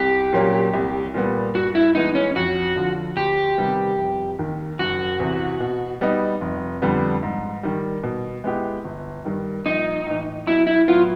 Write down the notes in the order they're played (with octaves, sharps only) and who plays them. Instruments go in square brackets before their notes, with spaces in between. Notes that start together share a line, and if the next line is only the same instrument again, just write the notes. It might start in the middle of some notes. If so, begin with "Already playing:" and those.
Already playing: [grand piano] C2 [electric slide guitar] G4
[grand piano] A#2 F#3 A#3 C#4
C2
A#2 G3 B3
[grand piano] G2 [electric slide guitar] F#4
[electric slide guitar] E4
[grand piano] E3 G#3 B3 [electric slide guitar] D#4
[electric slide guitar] C#4
[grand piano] F2 [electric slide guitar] F#4
[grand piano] D3 F3
[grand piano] D2 [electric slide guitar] G4
[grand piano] C3 D#3 G3 B3
F1
D#2 D#3
[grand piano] F#1 [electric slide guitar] F#4
[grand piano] E2 C3 E3
B2
G3 B3 D#4
F1
F2 D3 G3 B3
G#2
D#3 G3
B2
G#3 B3 E4 G4
G1
G2 D#3 G3
[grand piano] A#1 [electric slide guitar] D#4
[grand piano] A2 E3
[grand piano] B1 [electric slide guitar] E4
[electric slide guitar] E4
[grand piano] A2 F#3 B3 [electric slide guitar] F4